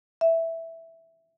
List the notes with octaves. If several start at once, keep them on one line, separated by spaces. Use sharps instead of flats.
E5